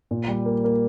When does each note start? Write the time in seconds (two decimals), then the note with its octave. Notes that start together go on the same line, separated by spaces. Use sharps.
0.11 A#2
0.28 G3
0.46 A#3
0.64 A#3